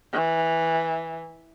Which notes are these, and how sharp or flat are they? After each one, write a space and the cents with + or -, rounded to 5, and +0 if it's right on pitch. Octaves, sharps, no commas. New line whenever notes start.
E3 -10